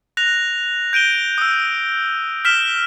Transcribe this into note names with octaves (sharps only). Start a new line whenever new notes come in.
F#6 A#6 F7
G6 D7 D#7 G7
D#6 E6
F6 B6 E7 G7